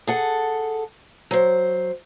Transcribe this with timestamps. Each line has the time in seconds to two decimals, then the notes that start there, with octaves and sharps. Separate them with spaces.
0.07 G#4 A4 F#5
1.31 F#3 C5